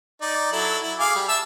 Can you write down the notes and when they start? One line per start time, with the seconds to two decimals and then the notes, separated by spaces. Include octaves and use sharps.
0.21 D#4 D5
0.52 F#3 E4 A4
0.83 E4
0.99 G#4 F5 D6
1.16 G3
1.29 E5 A5 E6